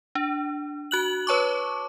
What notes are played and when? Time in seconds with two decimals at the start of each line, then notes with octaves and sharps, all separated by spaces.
0.15 D4
0.91 F#4 F#6 F#7
1.27 B4 C#5 A5 C#6 D6